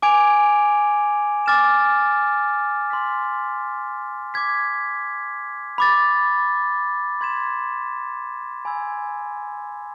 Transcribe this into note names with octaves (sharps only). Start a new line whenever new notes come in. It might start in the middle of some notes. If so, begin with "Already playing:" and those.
G#5 D6 G#6 D7 F7
G#5 D6 F6 A6 E7
C6 F6 B6
D6 G#6 B6
B5 D6 A6
C6 G#6 B6 E7
G#5 B5 E6 G#6